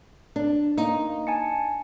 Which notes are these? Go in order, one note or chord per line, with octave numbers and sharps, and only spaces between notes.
D4
A#3 D#4
G#5 A5 C#7